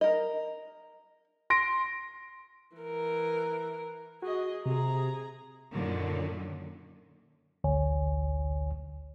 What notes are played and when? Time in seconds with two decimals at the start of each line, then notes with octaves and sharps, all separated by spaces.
0.01 A#4 D#5
1.50 C6 A#6 D7
2.77 E3 A#4
4.22 F#4 G#4 D#5
4.66 C3 G#4 A#5
5.73 F#2 A#2 D3 D#3 F#3
7.64 A1 D2 D3 C#5 G#5